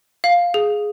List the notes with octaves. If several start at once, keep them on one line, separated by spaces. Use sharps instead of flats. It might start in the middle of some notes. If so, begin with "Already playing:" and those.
F5
G#4